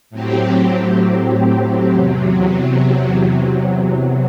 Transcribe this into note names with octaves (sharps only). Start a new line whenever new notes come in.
A2 F#3 C4 G4
E2 C3 F#3